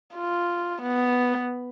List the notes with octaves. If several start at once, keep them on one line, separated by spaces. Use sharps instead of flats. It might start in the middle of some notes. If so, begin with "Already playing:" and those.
F4
B3